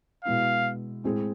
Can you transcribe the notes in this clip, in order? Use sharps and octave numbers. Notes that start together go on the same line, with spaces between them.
B2 G#3 B3 E4 F5
A2 G#3 C4 G#4